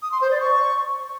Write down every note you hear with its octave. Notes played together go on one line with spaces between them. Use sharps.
D#6
C6
C5
D5
C#6